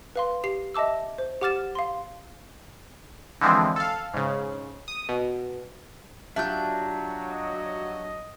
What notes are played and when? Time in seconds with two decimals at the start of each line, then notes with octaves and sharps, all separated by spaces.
0.16 B4 F5 C6
0.44 G4 C7
0.74 D#5 E5 A5 D6 E6
1.18 C5
1.41 G4 F#5 D6 F6 A6 E7
1.75 F5 C6
3.41 D3 E3 F3 G#3 C4
3.76 A4 F5
4.14 G#2 C#3
4.88 D#6
5.09 B2
6.36 F#3 D4 F4 G4 E5 G6
7.32 D#5